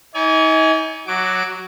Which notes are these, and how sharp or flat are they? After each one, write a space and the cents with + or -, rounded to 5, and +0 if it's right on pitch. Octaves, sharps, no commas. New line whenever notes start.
D#4 +40 D5 -45 G#5 +0
F#3 +0 F#4 +10 D6 +0